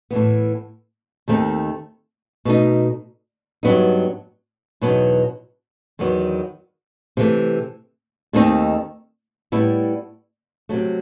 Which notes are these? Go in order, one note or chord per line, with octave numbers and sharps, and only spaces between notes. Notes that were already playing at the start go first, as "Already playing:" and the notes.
A2 E3 B3
D#2 D#3 A3 C4 D#4
B2 A3 D#4
G2 F#3 B3 D#4
E2 B2 F#3 B3 D#4
E2 D#3 F#3 B3
C3 E3 A3
D#2 D#3 A3 C4 D#4
A2 G3 B3 E4
C3 F#3 A3